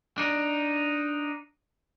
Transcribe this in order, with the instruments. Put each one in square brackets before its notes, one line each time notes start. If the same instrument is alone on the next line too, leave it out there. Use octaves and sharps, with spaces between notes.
[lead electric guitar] D4 D#4